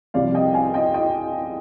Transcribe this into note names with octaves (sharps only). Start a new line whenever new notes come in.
C2 C3 F3 C4 D5 F5
D#5 G5
F5 G#5
D#5 G5
D#5 G5